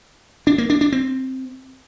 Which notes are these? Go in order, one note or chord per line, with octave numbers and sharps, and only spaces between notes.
D4
A#3
D4
D4
C4